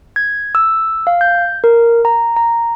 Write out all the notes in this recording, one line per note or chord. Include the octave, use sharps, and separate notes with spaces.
G#6
E6
F5
G6
A#4
A#5
A#5